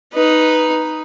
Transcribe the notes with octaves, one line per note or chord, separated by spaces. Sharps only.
D#4 B4